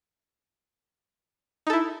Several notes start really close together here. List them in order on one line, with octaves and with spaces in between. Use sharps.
D#4 A4 E4